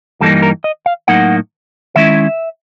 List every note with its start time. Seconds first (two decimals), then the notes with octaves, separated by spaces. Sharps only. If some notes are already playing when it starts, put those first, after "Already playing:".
0.21 G2 E3 G3 A#3 D#4 A4
0.42 A#4
0.64 D#5
0.86 F5
1.08 A2 F#3 A#3 D#4 F#5
1.96 D#3 G#3 C#4 E4 E5